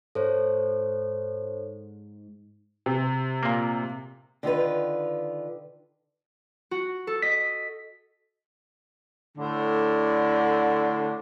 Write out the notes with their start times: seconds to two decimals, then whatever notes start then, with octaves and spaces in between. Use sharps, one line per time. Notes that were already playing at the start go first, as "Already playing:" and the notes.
0.15 G#2 A4 C5 C#5
2.86 C3
3.43 A#2 A#3
4.43 D3 D#3 F4 B4
6.71 F#4
7.07 A4
7.22 D#5 B6
9.36 A2 D3